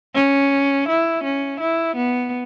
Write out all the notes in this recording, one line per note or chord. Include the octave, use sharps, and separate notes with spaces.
C#4
E4
C#4
E4
B3